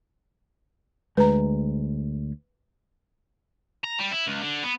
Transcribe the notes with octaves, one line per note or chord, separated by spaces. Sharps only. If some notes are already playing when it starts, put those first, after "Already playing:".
D2 G#3 B4 A#5
A#5
G3
E4
C#2
D3
B3